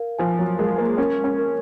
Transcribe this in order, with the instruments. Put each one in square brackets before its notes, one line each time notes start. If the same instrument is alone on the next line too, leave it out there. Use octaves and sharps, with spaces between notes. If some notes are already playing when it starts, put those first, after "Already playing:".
Already playing: [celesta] A#4 F5
[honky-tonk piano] F3 [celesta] G#5
[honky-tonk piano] F#3
[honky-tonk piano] G#3 [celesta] A#4
[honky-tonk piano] A#3
[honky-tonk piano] C#4 [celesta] A#4
[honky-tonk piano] C#4
[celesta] A#4